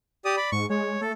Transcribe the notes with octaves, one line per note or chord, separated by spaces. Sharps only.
G4 D5 D#6
D5 B5
G#2 C#6
G#3 C#5
A3 A4